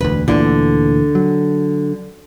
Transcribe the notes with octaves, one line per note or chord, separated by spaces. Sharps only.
E1 D2 B4
D2 A#2 D3 E3
F#3